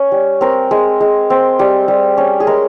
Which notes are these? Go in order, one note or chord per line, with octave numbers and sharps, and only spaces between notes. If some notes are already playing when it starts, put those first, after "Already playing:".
Already playing: C#4
G3
C4 A#4
G#3
G#3
C4
G3
G3
C#4
G#4
G#3 A#4